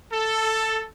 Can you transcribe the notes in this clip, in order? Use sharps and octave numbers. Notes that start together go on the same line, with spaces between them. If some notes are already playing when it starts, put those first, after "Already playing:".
A4